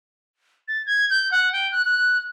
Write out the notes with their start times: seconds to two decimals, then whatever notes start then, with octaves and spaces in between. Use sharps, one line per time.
0.68 A6
0.86 G#6
1.10 G6
1.32 F#5
1.53 G5
1.72 F#6
1.85 F#6